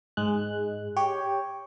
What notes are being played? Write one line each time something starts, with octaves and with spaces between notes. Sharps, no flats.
G#2 G#3 F#6
G4 C#5 G5